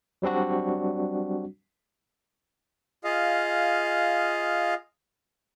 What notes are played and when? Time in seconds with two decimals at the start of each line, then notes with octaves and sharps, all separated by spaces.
0.22 F#3 G3 C4 D4 F#4
3.04 F4 G#4 D#5 F5